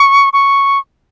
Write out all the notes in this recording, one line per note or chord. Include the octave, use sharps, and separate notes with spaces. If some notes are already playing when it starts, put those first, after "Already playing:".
Already playing: C#6
C#6